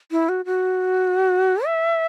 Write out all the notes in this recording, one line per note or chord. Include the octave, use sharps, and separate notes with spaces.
E4
F#4
F#4
E5